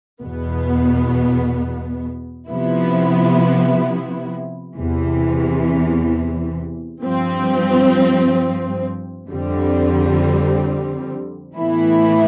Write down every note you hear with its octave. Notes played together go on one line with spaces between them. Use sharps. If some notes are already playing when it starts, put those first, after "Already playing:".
E2 B2 B3
C3 F3 B3 E4
E2 C3 E3
G2 F3 C4
F2 D3 G3 C4
A2 E3 B3 E4